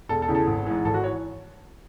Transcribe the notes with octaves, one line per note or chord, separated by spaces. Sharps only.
E1 A4
A4
E2 C#3 E3
A4
G#1
G#2 E3
G#1 A4
F#4
E3 C#5